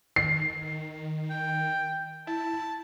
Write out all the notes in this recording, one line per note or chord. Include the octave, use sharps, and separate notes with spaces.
D#3 C7
G5
E4 A5